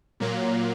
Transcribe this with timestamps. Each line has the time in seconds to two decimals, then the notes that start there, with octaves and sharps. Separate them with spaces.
0.20 A#2 F#3 A#3